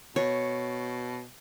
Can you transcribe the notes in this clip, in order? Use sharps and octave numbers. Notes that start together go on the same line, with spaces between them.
B2 C#5